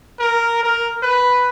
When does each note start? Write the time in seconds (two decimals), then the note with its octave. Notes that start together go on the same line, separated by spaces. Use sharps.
0.19 A#4
0.63 A#4
1.03 B4